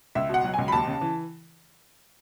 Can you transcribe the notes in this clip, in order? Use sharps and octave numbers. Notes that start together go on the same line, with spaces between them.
C#2 E5
B2 F#5
F#3
C#2 G#5
B5
D#2 A5
C#3
E3